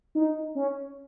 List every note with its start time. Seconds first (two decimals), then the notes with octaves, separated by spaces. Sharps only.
0.15 D#4
0.55 C#4